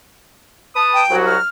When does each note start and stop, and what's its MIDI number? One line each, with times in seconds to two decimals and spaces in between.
0.75 1.02 71
0.75 1.02 81
0.75 1.02 87
0.94 1.16 79
1.10 1.35 36
1.10 1.35 54
1.10 1.35 66
1.26 1.49 89